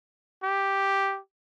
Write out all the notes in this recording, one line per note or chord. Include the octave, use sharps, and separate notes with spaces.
G4